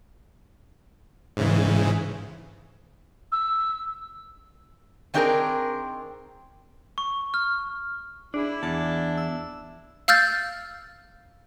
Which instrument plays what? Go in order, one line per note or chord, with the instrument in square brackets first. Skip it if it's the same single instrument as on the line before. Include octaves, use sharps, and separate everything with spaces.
[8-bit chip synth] G#2 C#3 E3
[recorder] E6
[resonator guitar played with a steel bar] D#3 C4 D4 G4 G#4 A#4
[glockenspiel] C#6
F6
[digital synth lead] D4 [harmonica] E4 [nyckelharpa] G#4 B5
[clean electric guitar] E2 [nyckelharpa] D4 [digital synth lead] A5
[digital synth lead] E6
[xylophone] F5 E6 F6 G6 A6